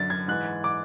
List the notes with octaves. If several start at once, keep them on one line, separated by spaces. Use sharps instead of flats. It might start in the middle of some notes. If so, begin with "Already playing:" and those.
Already playing: F#2 D3 A6
G#6
G#2 E3 F#6
D6